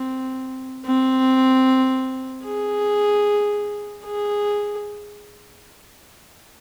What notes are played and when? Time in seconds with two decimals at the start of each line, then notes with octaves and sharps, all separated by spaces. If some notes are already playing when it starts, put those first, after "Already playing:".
Already playing: C4
0.85 C4
2.45 G#4
4.05 G#4